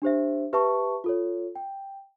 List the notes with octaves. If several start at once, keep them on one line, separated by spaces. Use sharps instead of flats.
D4 G4 C5 E5
G4 B4 E5 A5 C#6
F4 A4 C#5
G5